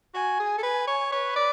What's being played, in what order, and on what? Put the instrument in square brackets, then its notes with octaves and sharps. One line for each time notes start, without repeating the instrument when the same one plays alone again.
[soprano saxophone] F#4 [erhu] G#5
[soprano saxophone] G#4
A4
[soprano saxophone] B4 [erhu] G#5
[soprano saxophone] C#5
[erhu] B4 [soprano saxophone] C#5
[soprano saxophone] D5